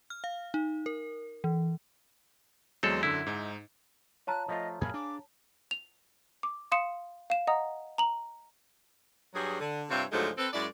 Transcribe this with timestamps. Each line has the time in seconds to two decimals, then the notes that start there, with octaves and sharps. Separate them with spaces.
0.10 F6
0.24 F5
0.54 D#4
0.86 A#4
1.44 E3
2.83 E2 F#3 G#3 C4 A4
3.03 F#2 D3 E4 E6
3.27 G#2 D#4
4.27 F4 C#5 F5 A5 A#5 F#6
4.48 F3 A3 F4 D#5
4.81 F#2 A#2 F#3 G#4 F5 B5
4.94 D4 D6
5.71 F7
6.43 D6
6.72 F5 C6 D#6 C#7 E7
7.30 F5 E7
7.47 D#5 F#5 A#5 D#6
7.98 A#5 F#7
9.34 G2 F#3 G3 G#4
9.60 D3
9.90 G2 C3 C4 F4 C#5 E5
10.12 D2 G#2 F3 F#3 G#3 A3
10.37 C4 A4 B4
10.53 F#2 G#3 E4 D5